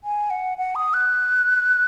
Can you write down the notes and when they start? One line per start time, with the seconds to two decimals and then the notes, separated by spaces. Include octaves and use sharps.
0.04 G#5
0.30 F#5
0.58 F#5
0.75 D#6
0.94 F#6